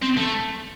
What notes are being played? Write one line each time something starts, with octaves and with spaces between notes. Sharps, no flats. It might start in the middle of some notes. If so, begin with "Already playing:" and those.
C4
A3